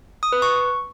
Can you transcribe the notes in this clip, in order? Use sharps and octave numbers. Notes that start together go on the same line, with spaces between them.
D#6
B4
C#6